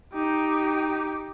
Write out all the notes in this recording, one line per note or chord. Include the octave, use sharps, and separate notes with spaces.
D#4 G4